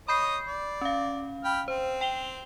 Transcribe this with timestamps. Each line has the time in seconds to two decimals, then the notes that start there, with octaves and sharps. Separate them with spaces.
0.08 C#5 D#5 B5 D#6 G6 C7
0.48 D5
0.81 C#4 F5
1.45 G5 B5 F6
1.68 C4 C5
2.01 G5 F7 G7